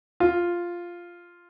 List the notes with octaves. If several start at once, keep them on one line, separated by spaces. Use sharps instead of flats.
F4